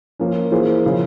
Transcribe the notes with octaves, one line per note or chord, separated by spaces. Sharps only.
F3 A#3 C#4
E3 A#3 F4 G#4 C5
C#3 F3